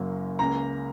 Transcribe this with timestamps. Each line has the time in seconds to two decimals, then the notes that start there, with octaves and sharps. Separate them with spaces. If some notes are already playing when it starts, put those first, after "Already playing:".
Already playing: F#1 F#2 F#3 A#3
0.39 C#2 C#3 A#3 A#5